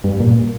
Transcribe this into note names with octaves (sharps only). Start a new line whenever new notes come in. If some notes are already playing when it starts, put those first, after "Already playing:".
G2
A#2